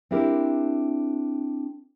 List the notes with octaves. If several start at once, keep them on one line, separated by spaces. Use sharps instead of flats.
C4 D4 E4 G4 A#4